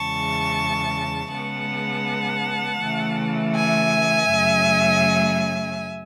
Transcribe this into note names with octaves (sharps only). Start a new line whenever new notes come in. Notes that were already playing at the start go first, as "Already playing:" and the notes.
Already playing: E2 C#3 G#3 A5 C#6
C#3 G#3 B3 F#5 A5
C#3 E3 A3
E5 G#5
F#2 C#3 F#3 A3